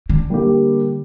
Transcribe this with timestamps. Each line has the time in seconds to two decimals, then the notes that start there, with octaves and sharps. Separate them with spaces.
0.10 D3
0.30 G3 A#3 D4 G4